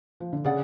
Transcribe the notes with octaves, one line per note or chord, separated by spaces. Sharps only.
F3
D3
C#3 D4 G#4 D5 F#5